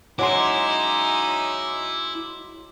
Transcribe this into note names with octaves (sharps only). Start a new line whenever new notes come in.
F#3 G#3 C#4 D#4 E4 C6 D6